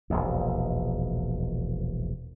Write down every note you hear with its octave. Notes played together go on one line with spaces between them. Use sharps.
E1 A#1 D#2